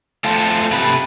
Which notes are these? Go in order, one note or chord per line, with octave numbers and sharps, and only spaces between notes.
A3 F4 A4 C5
C3 A3 B4